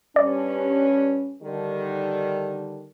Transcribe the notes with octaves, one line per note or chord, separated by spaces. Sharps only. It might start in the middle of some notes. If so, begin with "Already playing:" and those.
G2 C#4 D5
D3 D#3 G3